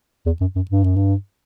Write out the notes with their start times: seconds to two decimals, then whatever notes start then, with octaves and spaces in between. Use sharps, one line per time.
0.26 E2
0.41 F#2
0.56 F#2
0.71 G2
0.84 F#2
0.96 G2